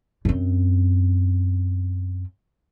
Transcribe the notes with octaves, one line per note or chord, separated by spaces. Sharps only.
F#2 C4